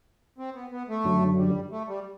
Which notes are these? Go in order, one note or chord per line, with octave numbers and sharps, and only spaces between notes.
C4
B3
B3
A3
F#2 D3 F#3
G3
A3
G3